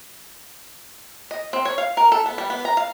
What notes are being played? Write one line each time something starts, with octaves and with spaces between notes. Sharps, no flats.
D#5
C4
C#5
F5
A#4
A4
B3
G3
B3
A#5
F5